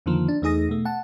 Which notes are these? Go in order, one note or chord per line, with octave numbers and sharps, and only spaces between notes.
F2 D3 D#3 F3 A#3
D4
E2 A3 D#4 G#4 D#6 A#6
B2 A3
F#5 A5